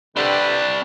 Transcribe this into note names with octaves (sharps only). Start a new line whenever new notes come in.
D3 G3 C4 B4 D5